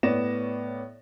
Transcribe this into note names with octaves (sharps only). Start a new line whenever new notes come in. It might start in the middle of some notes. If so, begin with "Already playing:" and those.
A2 B3 C#5 D5 A#6 E7